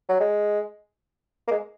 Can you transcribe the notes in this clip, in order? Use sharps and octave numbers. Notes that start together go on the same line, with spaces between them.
F#3
G#3
A#3
G#3